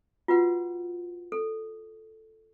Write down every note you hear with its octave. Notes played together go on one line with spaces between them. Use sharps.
F4 F#4 B4 F#5
A4